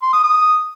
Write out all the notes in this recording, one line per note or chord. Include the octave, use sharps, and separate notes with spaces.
C6
D#6
D#6